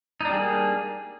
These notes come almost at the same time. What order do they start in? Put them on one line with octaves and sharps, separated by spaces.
D#4 D4 G3 G#4 A#3